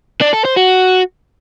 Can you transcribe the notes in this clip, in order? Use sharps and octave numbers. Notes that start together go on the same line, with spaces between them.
D4
A4
C5
F#4